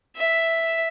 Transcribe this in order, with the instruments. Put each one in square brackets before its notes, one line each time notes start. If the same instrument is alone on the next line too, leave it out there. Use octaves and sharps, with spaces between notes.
[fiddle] E5